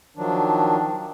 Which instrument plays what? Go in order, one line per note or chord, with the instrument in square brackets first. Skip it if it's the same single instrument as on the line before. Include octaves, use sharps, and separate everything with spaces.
[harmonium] D#3 F3 F#3 D4